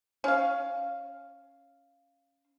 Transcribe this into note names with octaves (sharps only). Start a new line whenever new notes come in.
C#4 F5